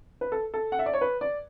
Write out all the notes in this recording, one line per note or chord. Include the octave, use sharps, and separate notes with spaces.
B4
A4
A4
F#5
E5
D5
C#5
B4
D5